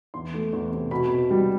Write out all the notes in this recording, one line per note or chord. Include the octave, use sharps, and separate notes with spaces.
E2 C6
A3
E2
C3
B2 B5
B2
G3